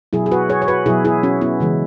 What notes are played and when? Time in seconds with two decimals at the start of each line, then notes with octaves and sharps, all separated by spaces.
0.13 B2 F#3 E4 G#4
0.26 G#4
0.31 F#4 B4
0.49 G#4 C#5
0.62 C#5
0.68 F#4 B4
0.86 B2 F#3 E4 G#4
1.05 E4 G#4
1.23 C#4 F#4
1.41 B3 E4
1.60 C#3 E3 G#3